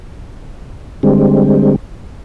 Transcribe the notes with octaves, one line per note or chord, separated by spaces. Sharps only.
D3 G3 G#3 C4